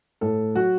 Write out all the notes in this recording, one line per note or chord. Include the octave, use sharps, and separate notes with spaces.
A2 A4
F#3 F#4